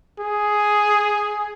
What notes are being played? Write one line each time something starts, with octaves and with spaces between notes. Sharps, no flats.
G#4